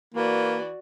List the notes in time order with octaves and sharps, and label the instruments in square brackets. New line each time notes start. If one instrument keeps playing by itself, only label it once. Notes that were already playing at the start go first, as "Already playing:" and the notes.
[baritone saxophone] E3 [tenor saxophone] A#3 [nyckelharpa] F#4 D5